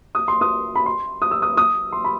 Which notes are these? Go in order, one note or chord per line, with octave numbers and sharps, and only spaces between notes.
D#6
C6
D#6
B5
C6
D#6
E6
D#6
D#6
C6
B5